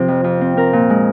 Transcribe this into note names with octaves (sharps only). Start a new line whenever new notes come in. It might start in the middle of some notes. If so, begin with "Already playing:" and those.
Already playing: C3 F3 C4
F2
F2
C4
C4 A#4
A#2
G#3